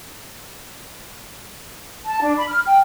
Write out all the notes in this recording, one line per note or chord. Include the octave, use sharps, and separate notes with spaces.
A5
D4
B5
F6
G5